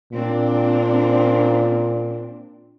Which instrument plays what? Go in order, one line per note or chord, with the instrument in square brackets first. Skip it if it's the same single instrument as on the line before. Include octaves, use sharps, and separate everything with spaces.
[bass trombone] A#2 [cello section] C4 D4